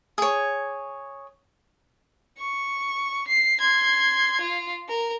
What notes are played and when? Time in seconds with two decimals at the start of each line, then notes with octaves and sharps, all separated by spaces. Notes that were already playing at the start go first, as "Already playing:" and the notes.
0.18 G#4 C#5
2.39 C#6
3.28 C7
3.60 C6 G#6
4.40 F4
4.88 A#4